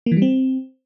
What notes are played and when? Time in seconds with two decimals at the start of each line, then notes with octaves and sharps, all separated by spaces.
0.06 A#3
0.12 E3
0.17 G3
0.22 C4